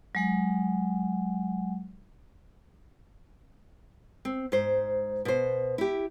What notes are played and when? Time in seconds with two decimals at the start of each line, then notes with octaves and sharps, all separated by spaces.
0.15 F#3 G#3 F#5
4.25 C4
4.52 G#2 C5
5.25 B2 C5
5.78 E4 G4